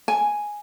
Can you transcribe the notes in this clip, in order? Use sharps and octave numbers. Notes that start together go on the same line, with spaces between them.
G#5